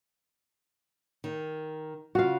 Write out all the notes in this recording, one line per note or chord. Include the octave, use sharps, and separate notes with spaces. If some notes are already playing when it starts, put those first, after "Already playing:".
D#3
C#3 F4 F#4 F5